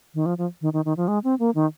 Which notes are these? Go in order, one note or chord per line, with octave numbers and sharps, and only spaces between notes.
D#3
F3
F3
D#3
D#3
D#3
F3
G#3
C4
A#3
D#3